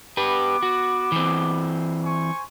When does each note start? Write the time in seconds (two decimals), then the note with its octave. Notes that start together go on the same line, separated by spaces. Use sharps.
0.17 B3 G4 B4 D6
0.63 F#4
1.12 E3 C4
2.04 C5 G#5 C#6